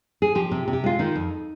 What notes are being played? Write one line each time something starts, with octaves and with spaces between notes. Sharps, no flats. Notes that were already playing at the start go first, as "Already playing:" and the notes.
G#4
F3 G4
C3
C3
G4
G#3 F4
D#3 D#4
F2